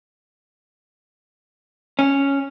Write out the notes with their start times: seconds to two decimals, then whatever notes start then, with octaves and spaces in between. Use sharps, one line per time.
1.99 C#4